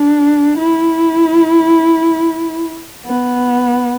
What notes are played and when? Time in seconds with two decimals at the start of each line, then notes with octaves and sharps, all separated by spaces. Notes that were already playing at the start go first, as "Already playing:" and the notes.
Already playing: D4
0.58 E4
3.06 B3